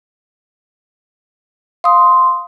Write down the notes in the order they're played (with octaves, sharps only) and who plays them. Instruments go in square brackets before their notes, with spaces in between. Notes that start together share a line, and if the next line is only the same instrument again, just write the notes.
[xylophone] F5 D#6 [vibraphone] C6